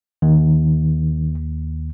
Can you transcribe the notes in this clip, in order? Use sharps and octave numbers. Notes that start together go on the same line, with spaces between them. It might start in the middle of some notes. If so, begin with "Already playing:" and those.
D#2 D#3